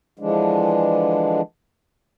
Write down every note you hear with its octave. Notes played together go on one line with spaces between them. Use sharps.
D3 E3 F3 G#3 D4